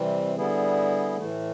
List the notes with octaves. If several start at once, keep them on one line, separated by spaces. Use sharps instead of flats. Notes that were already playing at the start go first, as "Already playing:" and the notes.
Already playing: C3 E3 G3 C4
D3 G3 B3 E4 G#4
A2 E3 A3